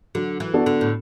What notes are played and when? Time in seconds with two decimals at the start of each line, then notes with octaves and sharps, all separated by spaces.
0.15 D3 F#3
0.40 E3
0.54 B3 D4 F#4 A4
0.66 D3
0.81 A2